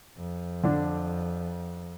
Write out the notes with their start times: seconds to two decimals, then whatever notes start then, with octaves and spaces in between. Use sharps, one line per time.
0.17 F2
0.63 D3 D4